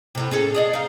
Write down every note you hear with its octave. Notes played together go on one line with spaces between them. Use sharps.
A2 C3
C#4 G#4 A4
G#4 D5 D#5
D#4 F5